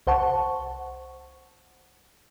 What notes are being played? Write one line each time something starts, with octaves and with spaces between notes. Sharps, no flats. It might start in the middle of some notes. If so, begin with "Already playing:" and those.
C2 C5 F#5 A5 C#6